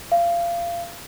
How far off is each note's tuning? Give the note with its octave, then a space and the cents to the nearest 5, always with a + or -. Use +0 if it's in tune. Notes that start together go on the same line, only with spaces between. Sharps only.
F5 -25